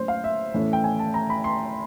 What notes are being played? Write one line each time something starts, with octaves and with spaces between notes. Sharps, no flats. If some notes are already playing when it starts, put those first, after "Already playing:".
Already playing: A2 F#3 A#3 C#4 C5
F5
E5
A2 E3 A3 C#4
G5
G#5
A5
A#5
B5
C6